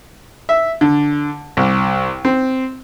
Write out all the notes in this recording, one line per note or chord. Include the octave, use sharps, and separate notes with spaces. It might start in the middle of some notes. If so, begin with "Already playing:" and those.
E5
D3
C2
C4